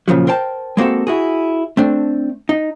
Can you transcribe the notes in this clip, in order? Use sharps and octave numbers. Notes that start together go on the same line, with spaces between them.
A#2 C#3 F3 F#3
A#4 C5 G5 A5
G#3 A#3 C4 F#4 A4
E4 F#4 G#4
A3 C4 D4
D#4